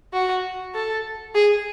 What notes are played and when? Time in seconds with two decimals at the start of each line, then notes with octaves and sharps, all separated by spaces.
0.13 F#4
0.75 A4
1.35 G#4